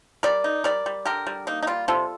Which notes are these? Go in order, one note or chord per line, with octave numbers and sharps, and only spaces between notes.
G3 A#4 D5
D#4
G3 A#4 D5
G3
D3 G4 A#4
G3
A#3 D#4
D#4
G3 F4
C3 F4 A4